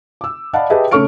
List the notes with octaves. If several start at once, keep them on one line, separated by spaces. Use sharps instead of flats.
D6 E6
D5 D#5 F5 F#5 A5 B5
G4 G#4 B4 D#5 E5 A5
C#3 A3 C#5 C#6 F6 D7